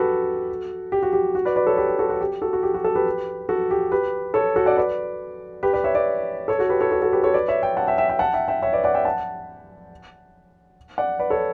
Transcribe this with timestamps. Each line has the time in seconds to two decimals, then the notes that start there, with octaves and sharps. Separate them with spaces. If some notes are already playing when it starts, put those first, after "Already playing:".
Already playing: F#4 G4 A4 B4
0.92 G4
1.03 F#4
1.13 G4
1.35 F#4
1.45 B4 D5
1.56 B4 D5
1.67 A4 C#5
1.77 G4 B4
1.88 G4
1.99 F#4 A4
2.09 F#4
2.21 G4
2.42 F#4 A4
2.53 F#4
2.63 G4
2.74 F#4
2.84 F#4 A4
2.95 G4 B4
3.49 F#4 A4
3.71 G4
3.92 G4 B4
4.34 A4 C#5
4.56 F#4 A4
4.66 D5 F#5
4.77 B4 D5
5.63 G4 B4
5.73 B4 D5
5.84 C#5 E5
5.95 B4 D5
6.48 A4 C#5
6.59 F#4 A4
6.70 G4 B4
6.81 A4 C#5
6.92 F#4 A4
7.02 F#4 A4
7.13 G4 B4
7.23 A4 C#5
7.34 B4 D5
7.48 C#5 E5
7.63 E5 G5
7.77 F#5 A5
7.87 E5 G5
7.98 E5 G5
8.09 E5 G5
8.19 F#5 A5
8.33 E5 G5
8.48 E5 G5
8.63 C#5 E5
8.73 B4 D5
8.84 D5 F#5
8.95 E5 G5
9.05 F#5 A5
10.98 D5 F#5
11.19 B4 D5
11.30 A4 C#5